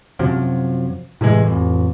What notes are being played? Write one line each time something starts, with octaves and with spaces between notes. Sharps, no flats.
F#2 C3 F3 F#3
A2 C3 E3 G#3
A1 F2